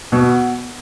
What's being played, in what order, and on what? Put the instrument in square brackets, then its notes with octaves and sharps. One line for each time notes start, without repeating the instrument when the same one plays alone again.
[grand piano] B2 [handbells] B3